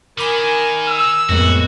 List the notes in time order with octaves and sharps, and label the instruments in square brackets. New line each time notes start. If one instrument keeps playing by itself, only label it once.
[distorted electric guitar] D#3 [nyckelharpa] A#4 G#5 [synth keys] B5 D6 D#6
[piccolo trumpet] E6
[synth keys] F2 A2 G#3 [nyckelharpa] A#3 B3 [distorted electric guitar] F#4